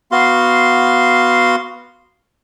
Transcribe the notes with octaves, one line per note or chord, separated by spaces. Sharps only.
B3 F#4 F5 C6